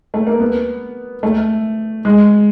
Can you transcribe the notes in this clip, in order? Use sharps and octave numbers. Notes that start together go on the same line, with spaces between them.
A3
A#3
B3
A3
G#3